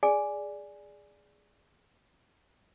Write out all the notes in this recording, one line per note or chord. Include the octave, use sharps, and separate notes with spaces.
G#4 D5 G#5